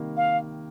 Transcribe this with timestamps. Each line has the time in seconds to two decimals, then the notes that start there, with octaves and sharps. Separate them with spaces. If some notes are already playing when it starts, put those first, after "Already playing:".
Already playing: C3 D#3 G3 A#3
0.17 F5